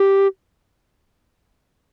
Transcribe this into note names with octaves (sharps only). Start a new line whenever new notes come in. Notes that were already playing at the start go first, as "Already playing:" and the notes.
Already playing: G4